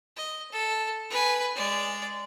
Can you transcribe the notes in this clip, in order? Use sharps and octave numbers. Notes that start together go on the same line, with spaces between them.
D#5
A4
B4 G#5
G#3 D5